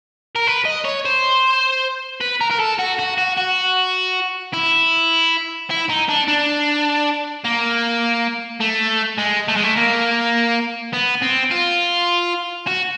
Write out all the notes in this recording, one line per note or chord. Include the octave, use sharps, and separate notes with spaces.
A#4
B4
D#5
C#5
C5
B4
A#4
A#4
A4
F#4
F#4
F#4
F#4
E4
E4
D#4
D4
D4
A#3
A3
G#3
A3
G#3
A3
A#3
B3
C4
F4
F#4